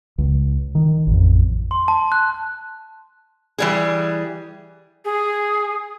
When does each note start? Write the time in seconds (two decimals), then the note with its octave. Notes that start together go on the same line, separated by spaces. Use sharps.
0.18 C#2
0.75 D#3
1.07 A1 F2
1.71 C6
1.88 A5
2.12 F#6
3.58 E3 G3 G#4
5.05 G#4